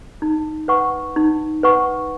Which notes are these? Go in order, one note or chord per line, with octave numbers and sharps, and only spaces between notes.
D#4
B4 F#5 C#6
D#4
B4 F#5 C#6